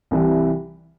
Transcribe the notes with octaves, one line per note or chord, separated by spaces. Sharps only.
C2 C3 E3 G3